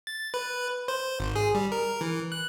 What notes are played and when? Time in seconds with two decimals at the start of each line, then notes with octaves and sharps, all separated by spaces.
0.07 A6
0.34 B4
0.88 C5
1.20 G#1
1.36 G#4
1.54 G3
1.72 A#4
2.01 E3
2.32 F#6